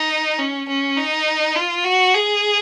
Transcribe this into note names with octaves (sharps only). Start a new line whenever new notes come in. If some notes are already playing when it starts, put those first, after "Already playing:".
Already playing: D#4
C#4
C#4
D#4
F4
F#4
G#4